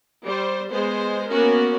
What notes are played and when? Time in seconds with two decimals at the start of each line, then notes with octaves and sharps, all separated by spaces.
0.24 G3 C5
0.71 G#3 B3 C5
1.30 A#3 B3 C#4 F#4 A#4